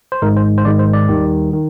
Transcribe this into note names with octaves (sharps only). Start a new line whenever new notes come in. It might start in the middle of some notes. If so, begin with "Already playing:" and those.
C5
G#1 G#2 D#3 G#3 A#4
C5
C5
G#1 G#2 D#3 G#3 D5
C5
D5
D#2 D#3 G3
D#3